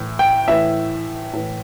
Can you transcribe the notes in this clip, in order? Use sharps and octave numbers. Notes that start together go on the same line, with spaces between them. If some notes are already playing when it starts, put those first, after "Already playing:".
Already playing: A2 E3
G5
A2 E3 E5
A2 E3